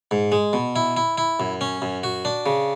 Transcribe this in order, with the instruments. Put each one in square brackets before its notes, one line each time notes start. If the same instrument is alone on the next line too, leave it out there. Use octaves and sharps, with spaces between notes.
[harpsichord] G#2
G#3
B2
E4
E4
E4
F#2
C#4
F#2
F#4
D4
C#3